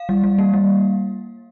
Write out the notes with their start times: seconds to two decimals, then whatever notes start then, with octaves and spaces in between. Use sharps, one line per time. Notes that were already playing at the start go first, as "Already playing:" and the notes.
Already playing: F5
0.09 G3
0.24 G3
0.38 A#3
0.53 G3